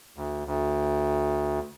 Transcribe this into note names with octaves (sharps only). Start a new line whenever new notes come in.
D2
D2